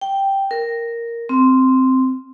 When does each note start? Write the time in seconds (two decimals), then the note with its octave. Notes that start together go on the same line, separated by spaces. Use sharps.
0.01 G5
0.51 A#4
1.29 C4